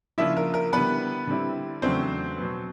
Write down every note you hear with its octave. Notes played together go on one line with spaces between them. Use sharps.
C#3 F3 A#3 D4 E4 F4 E5
A#4
A#4
D3 G3 B3 E4 B4
D3 G3 C4 E4
E2 C#3 F#3 A3 C4 D4 C5
B2 F#3 B3